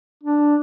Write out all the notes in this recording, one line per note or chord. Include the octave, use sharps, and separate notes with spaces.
D4